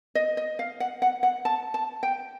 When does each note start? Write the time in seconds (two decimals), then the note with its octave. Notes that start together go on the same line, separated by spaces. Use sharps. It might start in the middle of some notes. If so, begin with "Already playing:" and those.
0.15 D#5
0.37 D#5
0.59 F5
0.80 F#5
1.02 F#5
1.23 F#5
1.45 A5
1.74 A5
2.03 G5